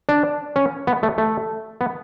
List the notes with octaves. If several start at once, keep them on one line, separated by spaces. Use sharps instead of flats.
D4
C#4
B3
A3
A3
B3